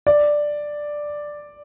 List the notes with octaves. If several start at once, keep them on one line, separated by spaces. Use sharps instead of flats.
D5